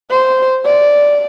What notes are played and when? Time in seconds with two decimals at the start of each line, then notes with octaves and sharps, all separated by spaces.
0.10 C5
0.65 D5